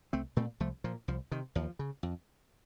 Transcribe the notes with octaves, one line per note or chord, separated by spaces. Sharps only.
C2 A3 C4
A#2 A3 C4
C2 F3 A3
A#2 F3
C2 F3
C3 D#3
D#2 F3
C#3
F2